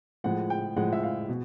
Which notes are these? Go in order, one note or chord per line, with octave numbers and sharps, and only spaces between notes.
A2 F3 G#3 F#5
G5
A2 F3 G#3 F#5
E5
F5
B2